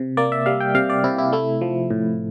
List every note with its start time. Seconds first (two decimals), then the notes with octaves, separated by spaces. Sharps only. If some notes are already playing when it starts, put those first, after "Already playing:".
Already playing: C3
0.17 A#3 D5
0.32 E5
0.46 G3 F5
0.60 G5
0.75 C3 F5
0.90 D5
1.04 C3 E4
1.18 E4
1.33 A3 E4
1.61 F3
1.90 A2